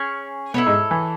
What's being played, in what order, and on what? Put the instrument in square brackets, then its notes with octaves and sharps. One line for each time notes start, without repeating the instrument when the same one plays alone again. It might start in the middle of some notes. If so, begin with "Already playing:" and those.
Already playing: [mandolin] C#4 G#4 C#5
[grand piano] B2 B3 [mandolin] E4 A4 C#5
[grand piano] G#2 G#3
E3